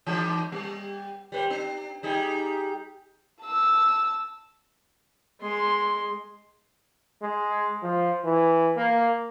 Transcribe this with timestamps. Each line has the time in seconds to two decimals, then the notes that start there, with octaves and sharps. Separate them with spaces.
0.07 E3 G#3 D#4
0.52 G3
1.32 G3 B4 C5
1.50 D4
2.03 G3 D#4 G#4
3.42 A5 E6
5.42 G#3 C6
7.22 G#3
7.83 F3
8.24 E3
8.77 A#3